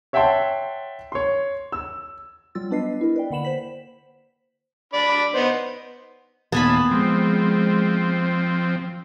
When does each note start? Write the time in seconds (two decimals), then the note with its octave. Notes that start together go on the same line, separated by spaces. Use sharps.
0.13 C#5 E5 F#5 G5 A5 C6
1.12 C#5 C6
1.72 E6
2.55 F#3 G3 F4 E6 A6
2.71 B3 D4 B4 D#5 C7
3.01 E4 A#4
3.16 B4 D5 G5
3.30 D3 A#3 F#5 B5 E7 F#7
3.45 C5 B6
4.93 D4 D5 B5
5.34 B3 D#4 C5
6.52 D#2 A#2 B3 G#5 A5 B5
6.91 F3 G#3 C4